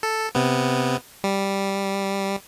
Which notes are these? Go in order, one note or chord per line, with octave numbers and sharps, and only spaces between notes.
A4
C3 B3
G3